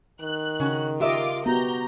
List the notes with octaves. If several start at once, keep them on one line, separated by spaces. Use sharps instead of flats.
D#3 F#6
C#3 C#4 F#4
F4 G4 A#4 D#5 E5 D6
B3 F#4 G4 A#5 G6